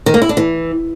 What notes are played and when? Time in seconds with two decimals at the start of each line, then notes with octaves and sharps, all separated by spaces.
0.06 D#3
0.14 A#3
0.22 E4
0.29 D4
0.37 E3